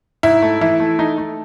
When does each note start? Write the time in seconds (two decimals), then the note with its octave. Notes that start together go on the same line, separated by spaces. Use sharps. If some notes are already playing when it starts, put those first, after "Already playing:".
0.23 G#2 E4
0.42 A3
0.61 E3 E4
0.80 A3
0.99 A3 D#4
1.18 A3